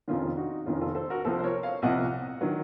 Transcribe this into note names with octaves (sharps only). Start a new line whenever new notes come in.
F1 F2 D#3 C#4 F4
D#4 F#4
F1 F2 D#3 C#4 F4
F4 A4
A4 C5
F#4 A#4
C2 C3 F3 A4 C5
C5
A#4 C#5
C#5 F5
C2 C3 F3 D#5 F#5
D#3 F#3